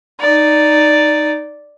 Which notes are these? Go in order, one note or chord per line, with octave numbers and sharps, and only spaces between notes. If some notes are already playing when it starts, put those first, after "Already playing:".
D#4 D5